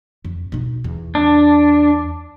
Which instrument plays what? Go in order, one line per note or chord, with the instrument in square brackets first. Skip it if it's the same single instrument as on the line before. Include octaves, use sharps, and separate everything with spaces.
[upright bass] F2
B2 D#4
E2
[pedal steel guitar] D4